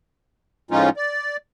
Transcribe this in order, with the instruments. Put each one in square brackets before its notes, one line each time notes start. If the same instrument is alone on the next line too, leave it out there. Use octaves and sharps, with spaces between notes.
[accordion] A2 F3 G#3 C#4 D#4 F4
D5